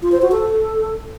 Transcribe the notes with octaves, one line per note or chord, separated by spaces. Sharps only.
F4
C5
F#4
A4